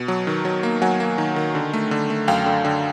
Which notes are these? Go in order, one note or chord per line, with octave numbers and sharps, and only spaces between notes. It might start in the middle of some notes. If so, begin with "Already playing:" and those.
Already playing: B2
F#3
D#3
F#3
A#3
F#3 F#5 G#5
A#3
D#3
D#3
D3
A3
D3
A3
F#2 F5 G5
D3
D3